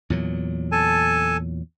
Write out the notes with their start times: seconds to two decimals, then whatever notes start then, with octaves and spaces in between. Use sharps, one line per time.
0.10 E2 A#2 F#3
0.72 A4 G#5 A5